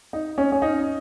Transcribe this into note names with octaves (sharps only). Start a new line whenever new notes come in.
D#4
C#4
C#4
D#4